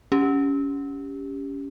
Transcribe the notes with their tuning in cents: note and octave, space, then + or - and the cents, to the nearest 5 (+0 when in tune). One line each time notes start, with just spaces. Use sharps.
C#4 +20 G4 +10